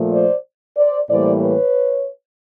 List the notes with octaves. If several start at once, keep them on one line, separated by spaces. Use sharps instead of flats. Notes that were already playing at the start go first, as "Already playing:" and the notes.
Already playing: A#2 F3 A3
C5 D5
C5 D5
A2 E3 G3 A#3 C5 D5
B4 C#5